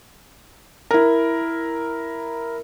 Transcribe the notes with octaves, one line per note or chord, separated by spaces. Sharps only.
E4 A#4